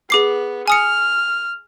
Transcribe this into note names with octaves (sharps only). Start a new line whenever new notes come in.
B3 G#4 D6 C7
G#5 D#6 F6 C#7